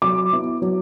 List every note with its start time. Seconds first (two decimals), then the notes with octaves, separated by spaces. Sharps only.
0.02 F#3 D6
0.32 B3 E4
0.62 F#3